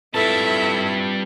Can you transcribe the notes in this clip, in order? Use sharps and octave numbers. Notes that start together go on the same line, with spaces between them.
G3 C4 E4 F4 A4 B4 E5 A5